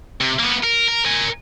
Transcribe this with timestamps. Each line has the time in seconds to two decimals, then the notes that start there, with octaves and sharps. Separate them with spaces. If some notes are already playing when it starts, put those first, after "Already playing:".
0.21 C3
0.40 A#3 B3
0.64 A#4
0.88 A#4
1.05 A#4 G#5